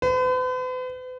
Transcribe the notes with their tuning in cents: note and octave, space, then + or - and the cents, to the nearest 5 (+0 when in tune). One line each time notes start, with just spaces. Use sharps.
B4 +45